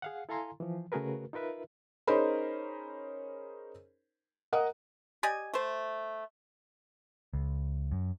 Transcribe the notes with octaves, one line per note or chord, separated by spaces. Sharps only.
G#4 F5 F#5
E4 A4 F5 G#5 A#5 C6
E3 F3
C#3 A3 F#4 G#4 A#4 B4
D#4 F4 A#4 B4 E5
C#4 D#4 G#4 A#4 C5 B5
A#4 D#5 F#5 D#6
G4 D5 D#5 G#5
A3 C5
C#2
F#2